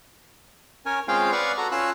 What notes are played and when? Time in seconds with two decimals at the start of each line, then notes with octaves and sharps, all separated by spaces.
0.86 C#4 A#4 C#5 G#5
1.08 G#3 C4 C#4 F4 F5 G5
1.32 B4 D5 F5 F#5 C#6
1.58 F#4 A4 A#5
1.72 C#4 F4 E6 F#6